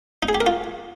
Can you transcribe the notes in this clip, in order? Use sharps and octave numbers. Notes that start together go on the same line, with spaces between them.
D#4
G#4
G4
A#4
F4